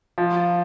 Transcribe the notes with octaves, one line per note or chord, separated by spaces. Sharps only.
F3